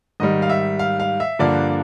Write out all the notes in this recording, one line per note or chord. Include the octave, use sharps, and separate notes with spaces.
G#2 D#3 G3 D#5
F5
E5
F5
F5
E5
G2 D3 F3 A#3 D4 D5